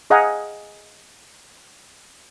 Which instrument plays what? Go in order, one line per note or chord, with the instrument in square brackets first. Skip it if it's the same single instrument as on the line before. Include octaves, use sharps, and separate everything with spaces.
[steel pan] G#4 D#5 F5 F#5 G#5 A#5